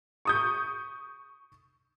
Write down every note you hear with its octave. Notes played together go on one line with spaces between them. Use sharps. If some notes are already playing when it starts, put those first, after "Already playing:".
C#6 D#6 G6